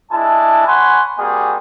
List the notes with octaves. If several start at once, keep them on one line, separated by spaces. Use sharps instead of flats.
G#3 D4 E4 A5
C#5 F#5 G#5 B5 C6
G3 A#3 C4 F#4 G#4